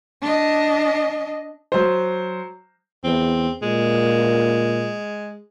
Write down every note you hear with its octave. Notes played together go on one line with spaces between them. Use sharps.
D4 D#5
F#3 C5
E2 C4
A#2 G#3